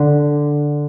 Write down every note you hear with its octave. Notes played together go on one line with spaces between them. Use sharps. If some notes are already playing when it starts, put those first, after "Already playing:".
Already playing: D3